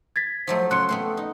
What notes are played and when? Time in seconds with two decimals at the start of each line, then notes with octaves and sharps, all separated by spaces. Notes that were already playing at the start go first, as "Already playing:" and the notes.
0.16 G#6 A6 B6
0.47 F3 F#3 A3 C5
0.71 C#3 C6 F#6 C#7
0.89 A3 B3 C4 C5
1.17 D#4